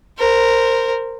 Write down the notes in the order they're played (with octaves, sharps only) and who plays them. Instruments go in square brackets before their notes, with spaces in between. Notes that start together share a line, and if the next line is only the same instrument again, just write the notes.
[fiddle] A#4 C5